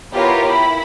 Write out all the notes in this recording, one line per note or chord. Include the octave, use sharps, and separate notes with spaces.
B3 E4 F4 G4 A#4 C#5
E4 B5